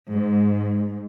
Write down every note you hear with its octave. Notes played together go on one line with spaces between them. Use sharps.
G#2